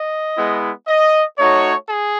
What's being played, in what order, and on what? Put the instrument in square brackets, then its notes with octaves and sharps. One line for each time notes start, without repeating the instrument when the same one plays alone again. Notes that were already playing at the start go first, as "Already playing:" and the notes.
Already playing: [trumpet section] D#5
G#3 B3 E4
D#5
A3 D#4 F#4 C#5
G#4